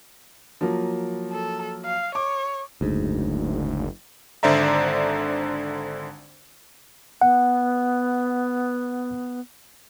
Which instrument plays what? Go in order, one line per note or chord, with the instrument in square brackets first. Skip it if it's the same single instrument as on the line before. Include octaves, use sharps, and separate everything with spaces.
[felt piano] F3 F#3 A#3
[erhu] A4
F5
[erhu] C#5 [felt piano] D6
[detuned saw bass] F#1 [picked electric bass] D2 G#2
[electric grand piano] G#1 D3 C5 D5 E5 A#5
[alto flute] B3 [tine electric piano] F#5